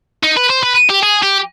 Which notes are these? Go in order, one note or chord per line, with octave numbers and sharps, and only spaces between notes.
D#4
B4
C5
B4
G4
G#4
G4